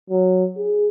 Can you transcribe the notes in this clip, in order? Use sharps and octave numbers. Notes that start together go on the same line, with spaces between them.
F#3
G#4